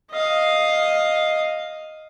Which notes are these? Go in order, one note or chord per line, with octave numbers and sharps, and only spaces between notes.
D#5 F5